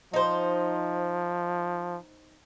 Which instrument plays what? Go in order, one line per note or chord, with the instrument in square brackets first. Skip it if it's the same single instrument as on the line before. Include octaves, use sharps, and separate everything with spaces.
[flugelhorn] F3 [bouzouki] D#4 C5